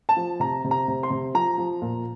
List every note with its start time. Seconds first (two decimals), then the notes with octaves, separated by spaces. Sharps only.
0.09 A5
0.17 F3
0.40 C3 A#5
0.64 C3
0.71 A#5
0.88 C3
1.03 C6
1.11 C3
1.35 F3 A#5
1.58 F3
1.82 A#2